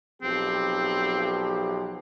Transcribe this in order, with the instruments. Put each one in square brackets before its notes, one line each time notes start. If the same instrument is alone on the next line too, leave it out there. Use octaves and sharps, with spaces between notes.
[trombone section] B1 F3 G4 [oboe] C4